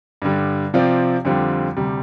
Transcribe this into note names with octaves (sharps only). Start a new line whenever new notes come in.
G2 D3 G3
C3 F3 C4 F4 D5
F2 D3 G3 C4 F4
D2 C3 G3